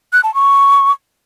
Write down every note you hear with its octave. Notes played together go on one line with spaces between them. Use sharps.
F#6
A5
C#6